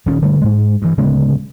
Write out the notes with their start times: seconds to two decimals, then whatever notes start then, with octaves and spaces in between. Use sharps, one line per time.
0.06 D#1 A#2 D#3 C#4
0.22 D3 G3 A3
0.42 G#2 G#3
0.82 G2 E3
0.97 D1 C#3 G#3 B3